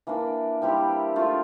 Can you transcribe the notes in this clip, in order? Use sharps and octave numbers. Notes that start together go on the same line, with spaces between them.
E3 A#3 D4
G3 C4 E4 G4
A3 D4 F4